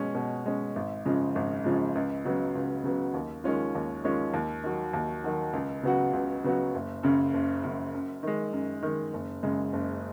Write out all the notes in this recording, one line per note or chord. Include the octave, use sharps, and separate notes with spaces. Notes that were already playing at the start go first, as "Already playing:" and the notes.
Already playing: B2 G#3 C#4
B2
G#3 C#4
G#1
F#2 C#3 F3 G#3
G#1
F#2 C#3 F3 G#3
C#2
C#3 F#3 B3
C#2
C#3 F#3 B3
D#2
D#3 G#3 C#4 F4
D#2
D#3 G#3 C#4 F4
D#2
D#3 F#3
D#2
D#3 F#3
C#2
C#3 F#3 B3 F#4
C#2
C#3 F#3 B3 F#4
F#1
F#2 C#3
F#1
F#2 C#3
F#2
D#3 G#3
F#2
D#3 G#3
F#1
F#2 C#3 G#3
F#1